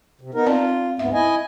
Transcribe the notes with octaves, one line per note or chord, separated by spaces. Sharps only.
C3
B3 D#4 A#4
C4 F4 D5
D2 G#2 B3 E5
E4 D#5 G#5